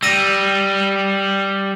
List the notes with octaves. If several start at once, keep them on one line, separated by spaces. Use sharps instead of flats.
G3 E6 A#6 D#7